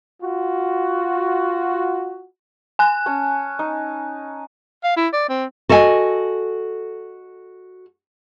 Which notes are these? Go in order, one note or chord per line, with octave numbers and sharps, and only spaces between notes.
F4 F#4
G#5 F#6
C#4 A5
D#4
F5
E4
D5
C4
F#4 A4 D#5 F5 G#5